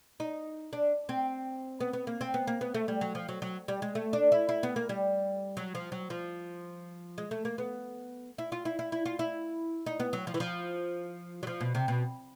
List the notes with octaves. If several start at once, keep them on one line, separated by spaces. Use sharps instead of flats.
D#4
D4
C4
B3
B3
A#3
C4
B3
A#3
B3
A3
G3
F#3
F3
F#3
F#3
G3
G#3
A3
D4
E4
E4
B3
A#3
G3
F#3
F3
F#3
F3
G#3
A3
A#3
B3
E4
F4
E4
E4
E4
F4
E4
D#4
B3
F#3
F3
E3
F3
F#3
F3
B2
C3
B2